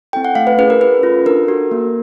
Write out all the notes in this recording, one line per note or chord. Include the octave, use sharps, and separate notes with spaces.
C4 E4 A4 G5
F#5
A3 F5
B4
C#4 E4 G#4 B4
A#4
C#4 B4
F4 A4
D4 A#4
F#4 A4
A#3